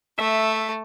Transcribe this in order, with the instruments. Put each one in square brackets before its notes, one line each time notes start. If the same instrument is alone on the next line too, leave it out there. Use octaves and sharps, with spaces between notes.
[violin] A3 [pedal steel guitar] E5